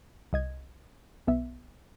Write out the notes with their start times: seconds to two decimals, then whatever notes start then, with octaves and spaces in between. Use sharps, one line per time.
0.33 C2 D#5 G#6
1.27 B1 B3 E5